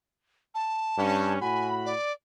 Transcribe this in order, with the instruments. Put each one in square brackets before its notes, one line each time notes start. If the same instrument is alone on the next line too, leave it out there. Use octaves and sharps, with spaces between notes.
[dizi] A5
[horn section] G2 C#4
[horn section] A2 F#4 B5 [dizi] G#5
[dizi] D5